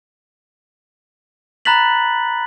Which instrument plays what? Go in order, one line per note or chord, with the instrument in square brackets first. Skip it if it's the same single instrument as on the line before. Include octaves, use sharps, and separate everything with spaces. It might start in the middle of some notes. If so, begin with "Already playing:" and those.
[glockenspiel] A#5 B5 F#6 A6 B6 F#7